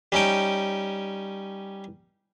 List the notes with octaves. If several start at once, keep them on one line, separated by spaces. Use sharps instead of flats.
G3 C#4 D#4 G5